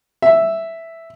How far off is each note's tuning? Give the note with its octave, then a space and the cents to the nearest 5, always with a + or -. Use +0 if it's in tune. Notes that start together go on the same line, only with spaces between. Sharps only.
E5 +0